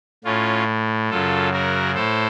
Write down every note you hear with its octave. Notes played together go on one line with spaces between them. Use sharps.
A2 C#4 F4
F#2 C#3 F4 A4
F#4 A#4
A2 A4 C5